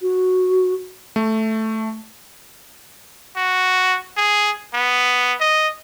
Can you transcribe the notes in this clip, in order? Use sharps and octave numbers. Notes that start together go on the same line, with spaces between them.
F#4
A3
F#4
G#4
B3
D#5